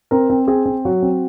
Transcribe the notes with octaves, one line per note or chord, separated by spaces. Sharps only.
C4 A#4
C4
C4 G#4
C4
F#3 F#4
C4